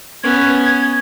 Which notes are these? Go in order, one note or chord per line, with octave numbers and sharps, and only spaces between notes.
B3 C#4 G#6